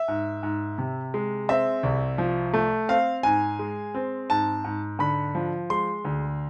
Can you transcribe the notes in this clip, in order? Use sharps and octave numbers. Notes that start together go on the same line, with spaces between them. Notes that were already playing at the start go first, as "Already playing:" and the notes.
Already playing: E5
G#2
G#2
C3
G#3
C4 E5
C2
F3
A3
C4 F5
G#2 G#5
G#3
C4
G#2 A5
G#2
D3 B5
F3
G#3 C6
D2